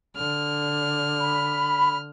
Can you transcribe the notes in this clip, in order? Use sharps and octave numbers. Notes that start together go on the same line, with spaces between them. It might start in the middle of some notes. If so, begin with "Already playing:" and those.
D3 F6
B5